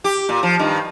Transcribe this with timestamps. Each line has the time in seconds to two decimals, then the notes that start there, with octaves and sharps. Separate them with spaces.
0.04 G4
0.29 A#2
0.43 F3
0.59 G2 D#3